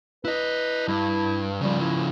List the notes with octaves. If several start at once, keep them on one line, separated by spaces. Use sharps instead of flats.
E4 B4 D#5
G2 E4
C#3 F3 G3
E4